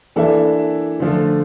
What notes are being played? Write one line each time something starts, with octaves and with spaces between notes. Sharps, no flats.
E3 A#3 D4 A4 E5
D3 F3 A3